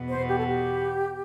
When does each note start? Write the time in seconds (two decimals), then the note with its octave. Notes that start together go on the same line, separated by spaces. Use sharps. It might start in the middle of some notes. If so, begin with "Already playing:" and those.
Already playing: E2 B2 B3
0.09 C5
0.29 G4
0.37 A4
0.47 G4